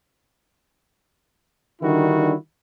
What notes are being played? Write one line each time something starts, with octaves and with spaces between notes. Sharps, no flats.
D3 D#3 G3 D4 E4 F#4